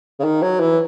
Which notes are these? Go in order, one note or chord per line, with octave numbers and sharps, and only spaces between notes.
C#3
D#3
F#3
E3